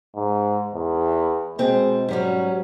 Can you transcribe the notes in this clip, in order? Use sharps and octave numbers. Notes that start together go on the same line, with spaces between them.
G#2
E2
B2 G#3 C4
G#2 F#3 G3 C#4